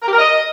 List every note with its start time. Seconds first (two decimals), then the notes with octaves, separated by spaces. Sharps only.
0.02 A#4
0.08 G4
0.13 A#4
0.19 D#5